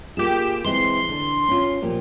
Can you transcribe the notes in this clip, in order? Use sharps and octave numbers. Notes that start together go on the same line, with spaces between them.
A#3 F4 G4 G#4 E7
E3 G#3 C4 C6
D3
C#4 F4
A#2 F3 G4